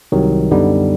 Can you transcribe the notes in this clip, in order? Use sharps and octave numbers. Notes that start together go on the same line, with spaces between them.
C2 C3 D#3 F#3
F#2 D3 G3 B3 D#4